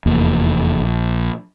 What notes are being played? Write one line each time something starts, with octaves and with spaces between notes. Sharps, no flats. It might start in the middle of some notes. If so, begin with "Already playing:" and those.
F1 E2 A#3
A#1